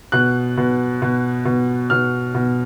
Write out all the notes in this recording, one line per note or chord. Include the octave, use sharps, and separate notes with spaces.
B2 F#6
B2
B2
B2
B2 F6
B2